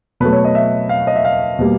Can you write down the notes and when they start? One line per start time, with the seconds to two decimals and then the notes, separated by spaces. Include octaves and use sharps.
0.20 B2 F#3 A3 B4
0.33 C#5
0.44 D#5
0.55 E5
0.89 F5
1.07 D#5
1.16 E5
1.25 F5
1.59 B2 G3 A#3